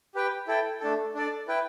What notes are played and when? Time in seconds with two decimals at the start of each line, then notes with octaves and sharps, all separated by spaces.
0.15 G4 B4 G5
0.47 E4 A4 G5
0.80 A3 D4 A4
1.15 D4 A4 D5
1.48 E4 B4 G5